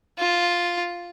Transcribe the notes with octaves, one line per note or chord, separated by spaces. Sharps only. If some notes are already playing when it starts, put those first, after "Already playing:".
F4